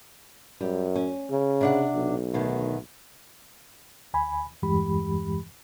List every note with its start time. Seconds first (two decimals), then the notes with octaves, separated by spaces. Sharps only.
0.61 F#2 G3
0.96 C#4
1.31 C#3
1.61 C3 D4 F#5
1.95 B1
2.34 D2 B2 D#3
4.14 D2 G#5 B5
4.62 E2 G2 E3 G#3 G4 B5